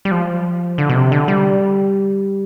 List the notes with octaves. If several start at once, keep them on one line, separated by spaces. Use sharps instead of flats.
G3
F3
D3
B2
C3
D3
G3